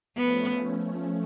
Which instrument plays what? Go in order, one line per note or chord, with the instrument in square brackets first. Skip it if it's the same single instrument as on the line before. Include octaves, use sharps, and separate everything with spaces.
[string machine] F3 A3 C#4 [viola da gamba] B3